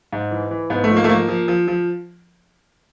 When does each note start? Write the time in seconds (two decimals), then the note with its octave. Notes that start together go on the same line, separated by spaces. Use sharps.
0.13 G#2
0.31 E3
0.51 E3
0.70 G#2 B3
0.84 A3
0.90 F3
0.97 A#3
1.04 A3
1.09 F3 A#3
1.29 F3
1.48 F3
1.68 F3